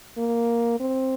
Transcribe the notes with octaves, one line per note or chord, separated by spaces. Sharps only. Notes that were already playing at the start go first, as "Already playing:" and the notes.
A#3
C4